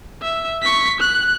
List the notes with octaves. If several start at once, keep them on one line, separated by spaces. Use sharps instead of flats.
E5
C#6 B6
F#6